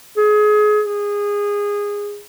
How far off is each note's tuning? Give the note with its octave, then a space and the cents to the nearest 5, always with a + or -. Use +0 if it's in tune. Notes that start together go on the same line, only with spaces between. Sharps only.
G#4 +25
G#4 -20